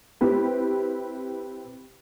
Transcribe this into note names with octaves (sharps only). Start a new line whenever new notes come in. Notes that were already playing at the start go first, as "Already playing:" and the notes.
C4 E4 G4 B4